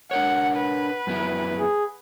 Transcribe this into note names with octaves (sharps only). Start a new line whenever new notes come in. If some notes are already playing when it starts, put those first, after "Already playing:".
D4 A#4 C#5 F#5
B4
F#2 B3 E4
G#4